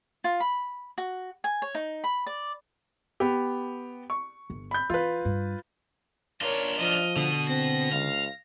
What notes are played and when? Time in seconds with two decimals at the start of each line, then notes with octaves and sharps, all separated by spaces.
0.24 F4
0.40 B5
0.98 F#4
1.44 G#5
1.62 C#5
1.75 D#4
2.04 B5
2.26 D5
3.20 B3 G4
4.10 C#6
4.50 G1
4.71 B5 G6
4.90 E3 F4 B4
5.25 G2
6.41 D4 F4 A#4 C#5
6.79 F3 D#5 F6
7.16 B2 D3 D#6
7.49 C4 A#6
7.92 C#2 F5